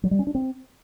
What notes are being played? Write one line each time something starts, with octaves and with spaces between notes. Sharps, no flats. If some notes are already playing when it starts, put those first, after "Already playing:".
F#3
G3
C#4
D4
C4